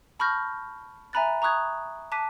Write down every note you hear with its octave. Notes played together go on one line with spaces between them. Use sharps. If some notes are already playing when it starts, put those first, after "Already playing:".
A5 B5 C#6 F6 G6 A#6
E5 G#5 A#5 B5 F#6 A6
A#5 C#6 D#6 F#6 G#6
A5 D6 F#6 B6 D#7